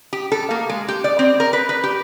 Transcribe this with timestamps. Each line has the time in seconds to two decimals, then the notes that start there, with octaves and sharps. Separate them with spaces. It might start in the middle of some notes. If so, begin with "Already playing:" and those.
0.13 G4
0.32 A4
0.51 A#3
0.69 G#3
0.88 G4
1.04 D5
1.19 C4
1.40 A#4
1.53 B4
1.69 B4
1.84 G4